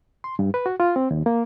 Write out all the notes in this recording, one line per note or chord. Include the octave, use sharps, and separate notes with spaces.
C6
G2
B4
F#4
F4
C4
D#2
A#3